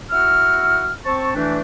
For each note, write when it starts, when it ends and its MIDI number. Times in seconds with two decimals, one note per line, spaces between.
0.11 0.93 64
0.11 0.93 66
0.11 0.93 78
0.11 0.93 88
0.11 0.93 89
1.05 1.34 60
1.05 1.34 81
1.05 1.34 85
1.35 1.61 52
1.35 1.61 57
1.35 1.61 62